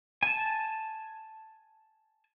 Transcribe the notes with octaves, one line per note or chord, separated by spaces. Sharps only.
G#5 A5